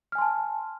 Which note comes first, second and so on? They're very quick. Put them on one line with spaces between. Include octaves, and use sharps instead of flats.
F6 G#5 C6 A5